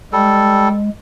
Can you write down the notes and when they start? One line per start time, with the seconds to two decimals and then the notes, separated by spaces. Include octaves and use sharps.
0.13 G3 G#3 A4